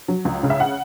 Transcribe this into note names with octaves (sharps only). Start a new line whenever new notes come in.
F#3
C#2
C#3
E5
F#5